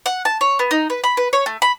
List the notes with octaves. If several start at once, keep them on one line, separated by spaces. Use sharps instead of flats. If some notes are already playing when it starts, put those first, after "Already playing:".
F#5
A5
C#5
B3
D#4
B4
B5
B4
C#5
A3
B5